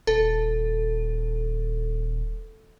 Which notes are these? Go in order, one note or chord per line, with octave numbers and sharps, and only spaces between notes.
D#1 A4